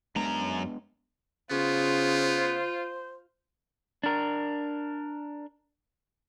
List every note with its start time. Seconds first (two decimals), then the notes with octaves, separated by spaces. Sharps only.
0.16 F#2 G#3 B3 D4 A#5
1.51 C#3 B3 F4 C5
4.04 D4 A#4